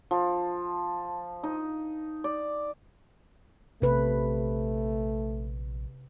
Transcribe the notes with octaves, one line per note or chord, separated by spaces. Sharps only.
F3
D#4
D5
A#1 C3 A3 B4